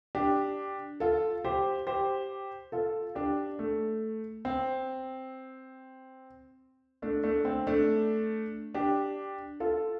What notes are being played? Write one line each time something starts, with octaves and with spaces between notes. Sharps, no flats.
D4 G4
F4 A4
G4 C5
G4 C5
F4 A4
D4 G4
A3
C4
A3 D4
A3 D4
C4
A3 D4
D4 G4
F4 A4